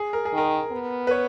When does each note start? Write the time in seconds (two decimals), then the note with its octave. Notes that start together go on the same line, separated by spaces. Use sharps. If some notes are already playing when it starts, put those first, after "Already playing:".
Already playing: G#4
0.13 A#4
0.25 G#4
0.33 D#3 A#4
0.71 B3
1.07 B4
1.11 C#5